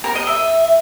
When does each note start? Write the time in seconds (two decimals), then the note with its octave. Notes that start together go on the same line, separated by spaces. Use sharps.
0.04 A#4
0.15 D#5
0.27 E5